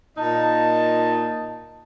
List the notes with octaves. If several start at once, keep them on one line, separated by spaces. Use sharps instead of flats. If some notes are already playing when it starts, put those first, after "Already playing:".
A#2 A#3 D#4 D#5 A5